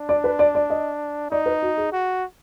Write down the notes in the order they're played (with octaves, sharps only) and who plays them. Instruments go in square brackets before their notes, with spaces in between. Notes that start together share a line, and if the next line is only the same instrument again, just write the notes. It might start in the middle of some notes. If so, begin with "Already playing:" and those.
Already playing: [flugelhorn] D4
[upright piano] D5
B4
D5
D5
D#5
[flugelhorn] D#4 [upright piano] D5
[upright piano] B4
F#4
G#4
[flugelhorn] F#4